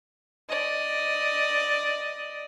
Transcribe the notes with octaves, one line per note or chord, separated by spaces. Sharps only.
D5 D#5